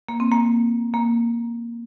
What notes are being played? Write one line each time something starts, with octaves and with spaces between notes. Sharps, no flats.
A#3
C4
A#3
A#3